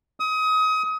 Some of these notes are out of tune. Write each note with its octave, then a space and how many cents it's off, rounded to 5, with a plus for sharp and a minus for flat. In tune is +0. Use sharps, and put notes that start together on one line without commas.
D#6 +30